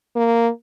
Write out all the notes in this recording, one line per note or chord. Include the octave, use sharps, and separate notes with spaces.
A#3